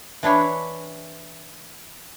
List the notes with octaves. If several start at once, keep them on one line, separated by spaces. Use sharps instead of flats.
E3 D4 E4 C#5